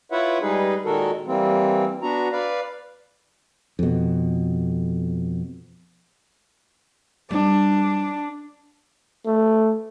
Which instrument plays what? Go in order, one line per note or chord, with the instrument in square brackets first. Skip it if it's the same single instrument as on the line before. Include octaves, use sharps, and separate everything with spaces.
[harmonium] E4 F4 B4 C#5 E5 F#5
G3 G#3 D#4 G#4 B4
A#2 D#3 G#3 F#4 A4 A#4
E3 G3 A#3 C4
B3 D4 F#4 A#5
B4 D5 F5
[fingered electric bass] F2 B2
[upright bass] G3 [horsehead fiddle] D4
[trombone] A3